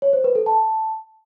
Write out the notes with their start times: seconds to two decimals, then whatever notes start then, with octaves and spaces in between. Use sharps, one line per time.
0.02 C#5
0.13 C5
0.24 B4
0.35 A4
0.46 A5